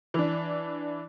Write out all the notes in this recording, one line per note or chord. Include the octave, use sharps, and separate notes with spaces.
E3 D4